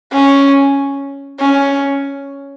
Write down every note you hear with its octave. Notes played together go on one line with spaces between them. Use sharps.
C#4
C#4